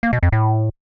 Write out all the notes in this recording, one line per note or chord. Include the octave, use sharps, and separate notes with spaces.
A#3
B2
F2
A2